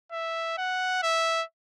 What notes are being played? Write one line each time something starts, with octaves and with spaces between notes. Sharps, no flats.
E5
F#5
E5